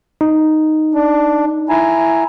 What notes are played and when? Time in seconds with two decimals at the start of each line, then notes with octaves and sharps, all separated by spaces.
0.21 D#4
0.95 D4
1.69 E4 G#5 A#5